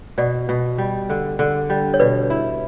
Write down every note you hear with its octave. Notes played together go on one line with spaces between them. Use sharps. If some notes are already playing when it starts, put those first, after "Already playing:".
B2 D5 F#5
B2
G3
D3
D3
G3
C#5
B2 B4 D5
E4